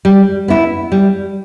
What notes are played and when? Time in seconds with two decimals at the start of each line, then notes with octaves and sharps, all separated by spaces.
0.05 G3
0.48 B3 E4
0.92 G3